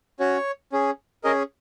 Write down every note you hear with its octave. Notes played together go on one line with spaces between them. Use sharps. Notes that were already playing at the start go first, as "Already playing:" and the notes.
C#4 F#4 C#5
C#4 G#4
C#4 G#4 A#4 D#5